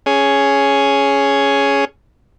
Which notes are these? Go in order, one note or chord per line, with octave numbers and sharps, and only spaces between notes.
C#4 G#4